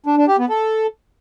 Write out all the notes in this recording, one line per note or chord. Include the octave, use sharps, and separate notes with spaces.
D4
D4
G4
B3
A4